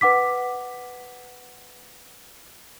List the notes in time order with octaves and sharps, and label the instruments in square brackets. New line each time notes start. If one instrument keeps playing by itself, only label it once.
[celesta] B4 F#5 D6 B6